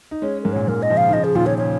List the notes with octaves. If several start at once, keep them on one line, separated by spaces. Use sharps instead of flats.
D#4
G#3 C#4 C#5
G#2 A#4
A#2 C#5
G#2 A#4
D#5
C#3 F3
F5
D#3
C#3 F3 D#5
G#4
A#2 D#3 F4
C#5
C#3 C#5